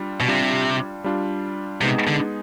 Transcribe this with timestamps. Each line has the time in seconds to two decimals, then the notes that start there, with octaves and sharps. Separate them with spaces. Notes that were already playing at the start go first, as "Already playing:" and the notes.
Already playing: G3 D4 F4
0.20 B2
0.28 C3 G3 D4 F4
1.04 G3 D4 F4
1.81 C3 G#3 B3 D#4 G#4
2.07 D3